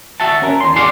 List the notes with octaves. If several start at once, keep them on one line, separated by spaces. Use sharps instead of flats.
F#4 E5 F#5 A5
C#4 A#4
E2 C6
F#4 G#4 D5 F5 F#5 C6